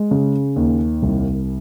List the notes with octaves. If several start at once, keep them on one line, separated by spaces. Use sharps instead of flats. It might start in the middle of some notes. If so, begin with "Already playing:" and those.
Already playing: G#3
C#3
D#2
C2